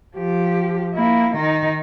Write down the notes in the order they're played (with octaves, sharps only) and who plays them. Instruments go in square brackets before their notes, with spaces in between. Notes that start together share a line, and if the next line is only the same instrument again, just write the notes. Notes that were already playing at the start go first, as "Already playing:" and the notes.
[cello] F3 G4
A#3 E4
D#3 D#4